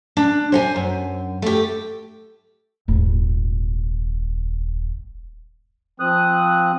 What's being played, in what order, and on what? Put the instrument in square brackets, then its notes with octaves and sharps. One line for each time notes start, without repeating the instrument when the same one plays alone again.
[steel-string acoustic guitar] D4
C5 F#5 G#5
F#2
A3 G4
[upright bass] D#1 G#1
[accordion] F3 C4 D#6 F#6